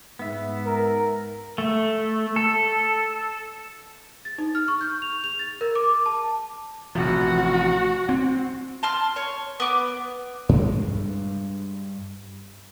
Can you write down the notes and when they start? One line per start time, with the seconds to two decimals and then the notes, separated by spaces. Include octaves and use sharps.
0.19 G#2 B3 E5
0.66 A#4
1.58 A3
2.36 A4
4.25 A6
4.38 D#4
4.55 F6
4.68 C#6
4.81 G6
5.02 F7
5.24 F7
5.39 A6
5.61 A#4
5.75 D6
6.06 A5
6.95 A1 C3 F3 F#4
8.09 C4
8.83 A5 C6 F6
9.16 C#5
9.60 B3 D6
10.49 G2 G#3